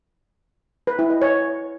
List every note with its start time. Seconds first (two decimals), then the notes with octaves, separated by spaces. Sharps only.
0.87 B4
0.99 E4
1.10 D#5
1.22 C#5